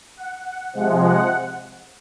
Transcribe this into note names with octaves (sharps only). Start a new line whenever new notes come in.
F#5
F#5
C3 F3 G#3 F#5
F#5